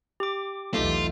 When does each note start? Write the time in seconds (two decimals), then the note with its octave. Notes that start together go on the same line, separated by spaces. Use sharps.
0.20 G4 D6
0.74 B1 E2 A3 D#4 F4